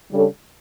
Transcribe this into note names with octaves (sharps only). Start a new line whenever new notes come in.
C#3 G3 D4 A4 C#5